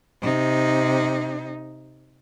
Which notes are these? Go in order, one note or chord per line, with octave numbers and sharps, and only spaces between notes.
C3 D#4